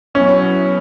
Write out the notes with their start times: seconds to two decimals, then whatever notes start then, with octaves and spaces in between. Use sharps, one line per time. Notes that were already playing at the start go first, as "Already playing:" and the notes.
0.14 B2 F#3 B3 C#4 E4